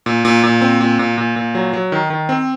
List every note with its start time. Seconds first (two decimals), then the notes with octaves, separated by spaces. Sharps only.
0.06 A#2
0.25 A#2
0.44 A#2
0.62 C4
0.81 A#2
0.99 A#2
1.18 A#2
1.36 A#2
1.55 F#3
1.73 F#3
1.92 D#3
2.10 D#3
2.29 C4